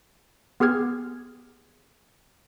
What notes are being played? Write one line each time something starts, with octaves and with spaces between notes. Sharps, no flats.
B3 G4 G#4 F6 G#6